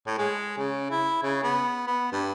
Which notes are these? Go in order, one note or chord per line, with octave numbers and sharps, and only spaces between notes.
A2
G#3
C#3
E4
C#3
B3
B3
G2